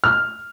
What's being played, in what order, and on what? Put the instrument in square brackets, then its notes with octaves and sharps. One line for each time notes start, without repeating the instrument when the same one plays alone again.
[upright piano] F6